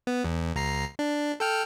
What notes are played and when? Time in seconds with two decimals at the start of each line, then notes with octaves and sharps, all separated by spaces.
0.07 B3
0.24 E2
0.55 C#2 A#5 C7
0.99 D4
1.40 A4 G5 F6